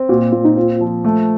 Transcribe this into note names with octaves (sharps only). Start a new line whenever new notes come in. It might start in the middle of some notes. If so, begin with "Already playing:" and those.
Already playing: C4
A#2 F#4
A#2 F4
D#4
C4 F4
F3
A3